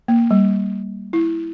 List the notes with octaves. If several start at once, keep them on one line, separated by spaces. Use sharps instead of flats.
A#3
G3
E4